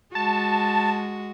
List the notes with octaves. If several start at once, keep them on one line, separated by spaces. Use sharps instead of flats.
G#3 F#4 A5